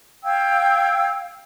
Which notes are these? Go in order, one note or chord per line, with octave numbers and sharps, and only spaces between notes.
F5 G5 E6 G#6